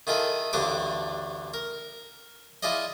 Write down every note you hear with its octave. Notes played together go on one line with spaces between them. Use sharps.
D#3 E4 F4 G#4 A4
A1 D2 G2 D4 C5 D6
A#4
E4 F4 G#4 D5 D#5